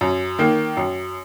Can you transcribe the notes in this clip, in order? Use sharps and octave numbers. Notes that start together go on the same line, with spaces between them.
F#2
D#3 A#3
F#2